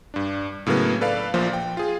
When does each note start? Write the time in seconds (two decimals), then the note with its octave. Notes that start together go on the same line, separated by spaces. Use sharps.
0.14 G2 D4
0.66 A2 C#3 F#3 A#3 B3
1.01 A4 B4 D5 F5
1.34 A#1 A#2 F3 C5
1.53 G5
1.77 F4 G#4